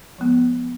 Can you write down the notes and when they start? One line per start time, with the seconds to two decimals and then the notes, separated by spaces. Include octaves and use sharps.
0.18 F3 G#3 B3